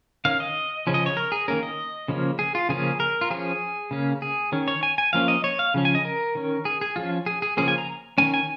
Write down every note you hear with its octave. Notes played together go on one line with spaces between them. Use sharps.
D#3 C#4 F5
D#5
C#3 F3 C#4
D#5
C#5
A#4
G#4
D#3 A#3 C#4 A#4
D#5
C#3 F3 A#3 C#4
G#4
F4
C#3 F3 A#3 C#4 G#4
A#4
F4
F3 C#4 G#4
C#3 A#3 C#4
G#4
D#3 C#4
C#5
G#5
G#5
F3 A#3 C#4 F5
D#5
C#5
F5
C#3 F3 C#4
G#5
D#5
A#4
D#3 C#4
G#4
G#4
F3 C#4 F4
G#4
G#4
C#3 F3 A#3 C#4 G#4
G#5
A#5
D#3 A#3 C#4 G#5
G#5